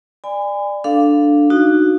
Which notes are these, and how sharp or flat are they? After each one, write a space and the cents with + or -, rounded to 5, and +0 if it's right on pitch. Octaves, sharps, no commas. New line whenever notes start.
D5 +15 G#5 -30 B5 +40
D4 +0 A4 +0 F5 +0
D#4 -15 F#4 +0